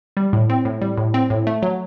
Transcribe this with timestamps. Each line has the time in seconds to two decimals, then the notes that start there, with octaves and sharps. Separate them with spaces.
0.17 G3
0.33 A2
0.50 C4
0.65 A2
0.81 G3
0.98 A2
1.14 C4
1.30 A2
1.47 A3
1.63 F#3